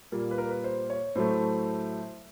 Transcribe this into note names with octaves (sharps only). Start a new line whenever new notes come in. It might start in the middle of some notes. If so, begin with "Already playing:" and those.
A#2 G3 A#3
B4
A#4
B4
C5
C#5
A2 F#3 A3 C5